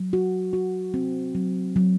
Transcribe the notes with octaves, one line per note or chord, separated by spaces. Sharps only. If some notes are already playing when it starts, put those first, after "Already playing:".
Already playing: F#3
F#4
F#4
C4
F#3
F#3